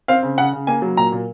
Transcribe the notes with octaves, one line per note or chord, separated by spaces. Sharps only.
C4 F5
C#3
C#3 F#5
C#3
A#3 G#5
F#3
A#2 A#5
A#2